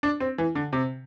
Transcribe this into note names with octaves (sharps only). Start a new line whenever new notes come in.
D4
C4
E3
D3
C3